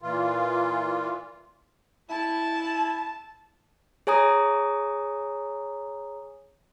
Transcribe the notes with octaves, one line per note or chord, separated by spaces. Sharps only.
A#2 E3 F4
E4 A5
G#4 C#5 G#5 A#5 D#6